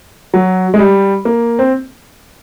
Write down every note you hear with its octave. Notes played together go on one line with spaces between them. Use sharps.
F#3
G#3
G3
A#3
C4